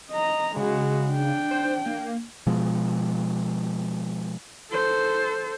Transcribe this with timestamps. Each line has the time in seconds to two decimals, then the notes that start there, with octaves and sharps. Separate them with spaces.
0.11 D#5 A#5
0.56 C#3 G#3 F#4
1.09 D4 G5
1.51 C5
1.86 A#3
2.47 B2 F3 G#3
4.71 A4 C5